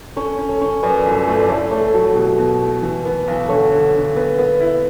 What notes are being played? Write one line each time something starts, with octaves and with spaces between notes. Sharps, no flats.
C#4 A4 C#5
C#4
A4 C#5
C#4
F#2 B4 D5
G1
A3
D5
E4 A4 C#5
A3 A4 C#5
F#3 F#4 A4
B2 E4 G4
B2
A3
E3
B3
B1
D3 A4 C#5
D3
D3
B3
B3
E4